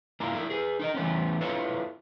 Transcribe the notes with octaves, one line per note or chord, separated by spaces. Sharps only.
A#3 E4 F4 A#4
E4 A4 A#4
G#4 A4 B4
D#4 A#4 D#5
E3 A3 B3 C#4
E4 F4 A4 B4 C#5